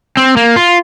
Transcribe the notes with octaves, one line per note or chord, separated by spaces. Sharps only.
C4
A#3
F4